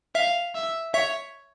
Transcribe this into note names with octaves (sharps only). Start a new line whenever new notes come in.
E5 F5
E5
C#5 E5